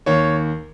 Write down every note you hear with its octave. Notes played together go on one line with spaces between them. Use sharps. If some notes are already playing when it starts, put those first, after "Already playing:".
D#2 C#5